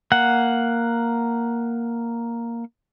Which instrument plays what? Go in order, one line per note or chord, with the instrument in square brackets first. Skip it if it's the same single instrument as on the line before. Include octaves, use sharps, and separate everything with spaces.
[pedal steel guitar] A#3 F#5